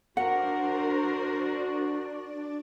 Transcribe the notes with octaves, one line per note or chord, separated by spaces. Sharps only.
D4 F#4 A#4 C5 D5 F#5